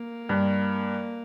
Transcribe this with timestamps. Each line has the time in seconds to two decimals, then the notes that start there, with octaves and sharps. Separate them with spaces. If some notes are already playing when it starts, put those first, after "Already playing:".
Already playing: A#3
0.29 G2